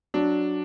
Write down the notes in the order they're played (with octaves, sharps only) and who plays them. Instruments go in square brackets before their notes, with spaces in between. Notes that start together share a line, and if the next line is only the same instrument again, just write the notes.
[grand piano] F#3 D4